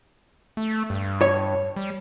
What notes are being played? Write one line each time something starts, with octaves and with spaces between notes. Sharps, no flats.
A3
G2
C#5
G3